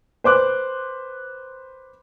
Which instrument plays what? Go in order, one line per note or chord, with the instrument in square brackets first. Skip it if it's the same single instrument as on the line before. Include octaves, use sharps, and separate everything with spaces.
[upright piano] B4 C5 D6 F#6